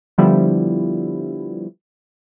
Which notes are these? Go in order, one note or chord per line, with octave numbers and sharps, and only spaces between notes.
D3 F3 G3 B3 E4